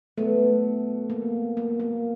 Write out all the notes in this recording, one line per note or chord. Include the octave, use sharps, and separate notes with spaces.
B2 F#3 A3 B3
A#3
A#3
A#3